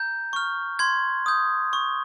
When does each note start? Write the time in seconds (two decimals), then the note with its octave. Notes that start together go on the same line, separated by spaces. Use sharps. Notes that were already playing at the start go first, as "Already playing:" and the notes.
Already playing: A#5 G6
0.33 C#6 F6
0.79 C6 G#6
1.26 D#6 G6
1.73 C#6